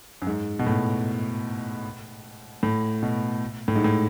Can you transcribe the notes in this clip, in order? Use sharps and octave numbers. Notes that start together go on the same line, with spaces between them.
F#2
G#2
B2
A2
A2
B2
A2
G#2
A2